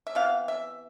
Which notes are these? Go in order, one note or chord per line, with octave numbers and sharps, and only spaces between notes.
E5
C3 E3 B3 F5
E5